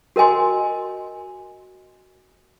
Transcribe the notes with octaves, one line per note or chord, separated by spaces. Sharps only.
F#4 A#4 D#5 G#5 C6